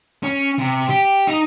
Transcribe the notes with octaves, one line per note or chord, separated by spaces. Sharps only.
C#4
C3
G4
D#4